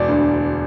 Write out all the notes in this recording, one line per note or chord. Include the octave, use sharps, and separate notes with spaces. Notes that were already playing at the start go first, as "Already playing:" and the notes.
Already playing: E1 D5
D2 D3